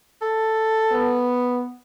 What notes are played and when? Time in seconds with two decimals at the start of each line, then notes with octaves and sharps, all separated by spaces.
0.22 A4
0.92 B3